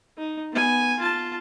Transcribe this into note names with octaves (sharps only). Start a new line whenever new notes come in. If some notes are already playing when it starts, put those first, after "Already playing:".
D#4
B3 G#5
F4 A5